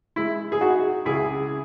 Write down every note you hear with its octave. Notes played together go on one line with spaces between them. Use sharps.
G#3 E4
G#4
D#4 F#4
C#2 E4 G#4